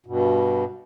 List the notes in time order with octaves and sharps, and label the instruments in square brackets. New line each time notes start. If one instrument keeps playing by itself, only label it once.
[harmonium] G2 B2